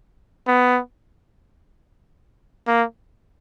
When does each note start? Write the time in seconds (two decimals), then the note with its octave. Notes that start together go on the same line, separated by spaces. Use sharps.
0.47 B3
2.67 A#3